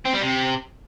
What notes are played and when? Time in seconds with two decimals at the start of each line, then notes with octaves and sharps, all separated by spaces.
0.05 C4
0.14 G3
0.22 C3